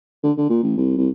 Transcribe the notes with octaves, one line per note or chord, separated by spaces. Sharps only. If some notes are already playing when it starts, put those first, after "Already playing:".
D3
D3
A#2
A1
C2
C2